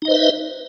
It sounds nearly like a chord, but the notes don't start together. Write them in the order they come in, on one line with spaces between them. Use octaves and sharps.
D#4 D#5 C5 B4 E5